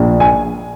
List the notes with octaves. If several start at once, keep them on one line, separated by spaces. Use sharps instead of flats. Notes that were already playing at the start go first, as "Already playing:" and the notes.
Already playing: A#1
G#5